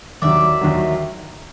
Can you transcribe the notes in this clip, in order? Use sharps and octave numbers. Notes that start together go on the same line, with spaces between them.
D#2 D#3 F#3 D5 E5
D#2 D#3 F#3